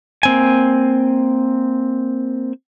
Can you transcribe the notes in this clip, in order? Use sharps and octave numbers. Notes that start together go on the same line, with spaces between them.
A#3 C4 G#5